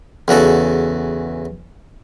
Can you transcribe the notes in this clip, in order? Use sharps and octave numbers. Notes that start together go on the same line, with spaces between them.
E2 C#3 F#4 A4